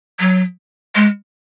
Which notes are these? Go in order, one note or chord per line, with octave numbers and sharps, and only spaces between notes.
F#3
G#3